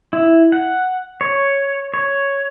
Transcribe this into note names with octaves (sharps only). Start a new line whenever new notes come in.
E4
F#5
C#5
C#5